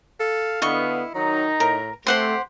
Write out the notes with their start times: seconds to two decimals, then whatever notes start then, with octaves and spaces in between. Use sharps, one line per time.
0.20 A4 F5
0.62 D3 B3 E4 D#5 C#6
1.15 D#3 F#3 D#4 A#5
1.60 A2 A#4
2.07 A3 C4 G4 C5 F#5 C6